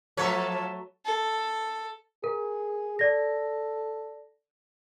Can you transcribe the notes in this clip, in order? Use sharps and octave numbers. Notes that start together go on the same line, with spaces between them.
F3 F#3 A3 A4 B4 C#5
A4
G#4 A#4
A4 D5 A#6